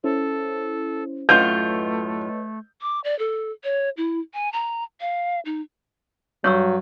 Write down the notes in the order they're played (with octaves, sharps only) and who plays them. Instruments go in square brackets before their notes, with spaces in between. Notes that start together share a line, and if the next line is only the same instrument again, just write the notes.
[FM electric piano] C#4 E4 C5 [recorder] A4
[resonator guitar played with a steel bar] F#2 A2 F4 [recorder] A3 [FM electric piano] B4 C#5 D#5 [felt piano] G6
[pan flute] D6
D5
A4
C#5
E4
G#5
A#5
F5
D#4
[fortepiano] G2 [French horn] F#3 [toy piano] C#5 C#6 E6